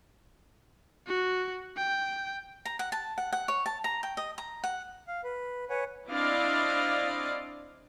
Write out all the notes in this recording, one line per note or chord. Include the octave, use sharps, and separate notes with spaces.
F#4
G5
A#5
F#5
A5
F#5
F#5
C#5
A5
A#5
G5
D#5
A#5
F#5
F5
B4
B4 C#5 F#5 G#5
C4 D4 E4 D5 D#5 F5